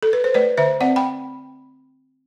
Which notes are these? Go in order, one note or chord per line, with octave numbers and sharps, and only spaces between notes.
A4
B4
C5
A3 B4 D5
D3 C5 E5
C4 D5 F#5
G5 B5